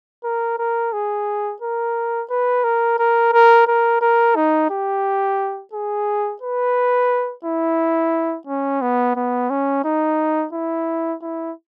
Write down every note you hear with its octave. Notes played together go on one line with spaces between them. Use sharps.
A#4
A#4
G#4
A#4
B4
A#4
A#4
A#4
A#4
A#4
D#4
G4
G#4
B4
E4
C#4
B3
B3
C#4
D#4
E4
E4